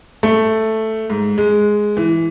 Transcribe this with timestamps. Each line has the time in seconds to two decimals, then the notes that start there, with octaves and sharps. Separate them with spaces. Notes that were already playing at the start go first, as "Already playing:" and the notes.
0.23 A3
1.10 G#2
1.38 G#3
1.97 E3